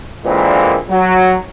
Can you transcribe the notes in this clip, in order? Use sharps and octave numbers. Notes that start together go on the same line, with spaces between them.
A#2 D3 E3 G#3 A#3 C4
F#3